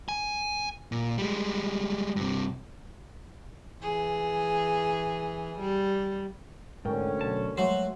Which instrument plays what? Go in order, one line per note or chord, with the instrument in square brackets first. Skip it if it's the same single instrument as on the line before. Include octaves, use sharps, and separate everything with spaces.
[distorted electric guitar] G#5
A#2
G3 G#3
G2 C3
[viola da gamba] E3 G#4
G3
[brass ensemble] D2 D3 C#4 [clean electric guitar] G#2 [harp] A#4 G5
[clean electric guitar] B1 E2 A5
[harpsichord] F#3 [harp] G#3 A3 C6 [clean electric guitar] C5